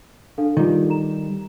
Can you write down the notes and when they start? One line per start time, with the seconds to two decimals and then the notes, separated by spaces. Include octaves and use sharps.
0.38 D4 A4 F5
0.57 D#3 G3 F4 A4
0.90 A#5 E7